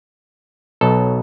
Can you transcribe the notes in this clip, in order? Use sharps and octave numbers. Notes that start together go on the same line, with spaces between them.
B1 B2 F#3 A4